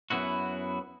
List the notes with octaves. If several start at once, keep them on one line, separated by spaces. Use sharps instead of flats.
F#2 B3 E4 F#4